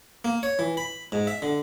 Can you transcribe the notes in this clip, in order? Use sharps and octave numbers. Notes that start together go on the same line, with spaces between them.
A#3
C#5
E3
B5
G#2
E5
D3